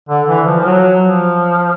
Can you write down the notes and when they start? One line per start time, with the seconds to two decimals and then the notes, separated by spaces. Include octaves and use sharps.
0.09 D3
0.28 E3
0.47 F3
0.59 F3
0.65 F#3
1.03 F3